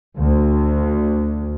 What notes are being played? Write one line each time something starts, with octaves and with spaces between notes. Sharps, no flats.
D2